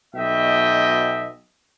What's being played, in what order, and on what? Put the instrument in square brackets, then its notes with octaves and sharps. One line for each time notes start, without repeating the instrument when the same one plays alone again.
[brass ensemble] B1 B2 D#5 E5 G5